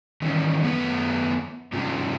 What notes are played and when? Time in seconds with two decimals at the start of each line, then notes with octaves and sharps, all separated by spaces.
0.22 D#3 E3 C#4
0.63 F#2 A3 B3 B4 F#5
1.72 G2 C3 C#4 F4